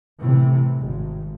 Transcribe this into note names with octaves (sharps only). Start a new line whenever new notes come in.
A2 C3 E3
G#1 G#2